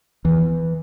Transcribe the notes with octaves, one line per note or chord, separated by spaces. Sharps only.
E2 E3